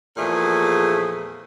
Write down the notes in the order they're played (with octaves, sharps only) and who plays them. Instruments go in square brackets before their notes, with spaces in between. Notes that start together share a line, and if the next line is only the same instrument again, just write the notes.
[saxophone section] E2 A#2 F3 A3 G#4